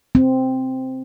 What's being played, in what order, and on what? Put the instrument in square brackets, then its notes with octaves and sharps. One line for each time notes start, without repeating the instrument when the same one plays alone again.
[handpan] C4